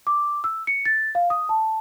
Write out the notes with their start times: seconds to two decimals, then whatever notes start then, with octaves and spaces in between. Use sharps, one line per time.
0.07 D6
0.44 E6
0.67 C#7
0.86 A6
1.15 F5
1.30 D#6
1.49 A5